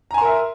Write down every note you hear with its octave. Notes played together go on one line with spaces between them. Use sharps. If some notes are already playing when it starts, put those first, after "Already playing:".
A#4 E5 G#5 A#5 C6